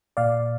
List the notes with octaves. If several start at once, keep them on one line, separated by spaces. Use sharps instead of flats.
A#2 D5 F5